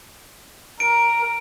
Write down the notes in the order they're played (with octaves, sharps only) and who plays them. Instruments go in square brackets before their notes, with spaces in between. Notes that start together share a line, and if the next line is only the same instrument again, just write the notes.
[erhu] A#4 [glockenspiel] D7